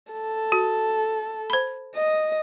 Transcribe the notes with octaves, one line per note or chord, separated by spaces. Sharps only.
A4
F#4
C5 B5
D#5